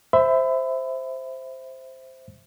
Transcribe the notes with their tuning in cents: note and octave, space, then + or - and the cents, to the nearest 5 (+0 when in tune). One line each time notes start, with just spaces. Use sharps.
C5 +0 E5 +0 B5 +30